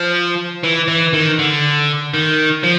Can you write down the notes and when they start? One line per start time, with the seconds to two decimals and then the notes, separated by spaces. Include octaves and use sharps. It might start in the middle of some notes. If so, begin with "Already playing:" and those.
Already playing: F3
0.64 E3
0.88 E3
1.13 D#3
1.39 D3
2.14 D#3
2.63 F3